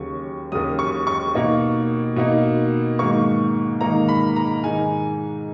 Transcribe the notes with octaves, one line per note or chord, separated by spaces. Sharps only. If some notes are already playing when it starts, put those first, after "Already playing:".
Already playing: D#2 C#3 F#3 C#6
D#2 C#3 F#3 D#6
C#6
C#6
B2 A#3 D#4
B2 A#3 D#4
G#2 D#3 A#3 D#4 C#6
G#2 D#3 A#3 D#4 A#5
B5
A#5
G#2 D#3 G#3 D#4 G#5